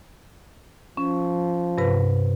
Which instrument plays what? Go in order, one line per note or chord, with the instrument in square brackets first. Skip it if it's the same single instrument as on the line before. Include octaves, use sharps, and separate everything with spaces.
[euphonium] F3 [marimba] C#4
[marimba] G2 C3 B4